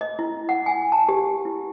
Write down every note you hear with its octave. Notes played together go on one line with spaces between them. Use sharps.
D#5
E4
F#5
G#5
A5
G4
E4